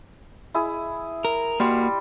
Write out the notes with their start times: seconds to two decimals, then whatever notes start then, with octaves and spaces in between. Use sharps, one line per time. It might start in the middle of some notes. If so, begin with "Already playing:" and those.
0.54 E4 G#4
1.25 A#4
1.60 G3 A#3 F#4 C6